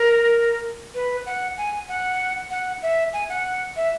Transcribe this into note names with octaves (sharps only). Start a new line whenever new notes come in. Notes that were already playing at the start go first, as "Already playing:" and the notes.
Already playing: A#4
B4
F#5
G#5
F#5
F#5
E5
G#5
F#5
E5